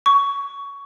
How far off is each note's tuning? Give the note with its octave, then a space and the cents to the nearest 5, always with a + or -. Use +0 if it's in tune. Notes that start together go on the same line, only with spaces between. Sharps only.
C#6 +15